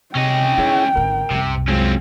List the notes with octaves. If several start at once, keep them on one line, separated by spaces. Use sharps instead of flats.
C3 C#4 D#5 G5
D#4 E4 G#4 C#5
G#1 D3 A#4
C2 F#2 C3
F#3 G#3 C4 C#4 F4